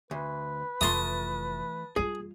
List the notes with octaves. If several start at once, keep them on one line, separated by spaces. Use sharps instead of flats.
D2 B4
F1 E3 A3 F4 A5 C6 D#6
G3 F4 G#4